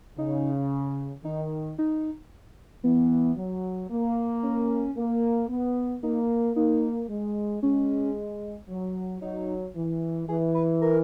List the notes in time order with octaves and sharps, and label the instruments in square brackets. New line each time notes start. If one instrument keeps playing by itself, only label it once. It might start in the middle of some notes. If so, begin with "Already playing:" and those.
[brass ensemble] C#3 [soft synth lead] D#4
[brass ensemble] D#3 [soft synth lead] D#4
[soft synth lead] D#4
[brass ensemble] E3 [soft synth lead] B3
[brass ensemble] F#3
A#3
[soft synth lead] C#4
[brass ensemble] A#3
B3
[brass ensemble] A#3 [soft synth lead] D#4
[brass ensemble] A#3 [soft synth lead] D#4
[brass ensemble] G#3
[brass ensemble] G#3 [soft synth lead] C#4
[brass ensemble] F#3
[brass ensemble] F#3 [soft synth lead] D#4
[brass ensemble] E3
[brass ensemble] E3 [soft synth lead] G#4
[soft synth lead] B4
A#4